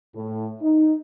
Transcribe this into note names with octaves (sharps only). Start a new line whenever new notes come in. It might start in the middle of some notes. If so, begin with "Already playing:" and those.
A2
D#4